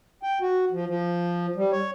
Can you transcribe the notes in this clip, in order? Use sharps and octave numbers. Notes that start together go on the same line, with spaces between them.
G5
F#4
F3
F3
G3
C#5